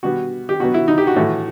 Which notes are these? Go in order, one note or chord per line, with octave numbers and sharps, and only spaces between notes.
B2 G3 B3 F#4
G4
B2 F#3 B3 F#4
E4
D#4
G4
F#4
A2 E3 A3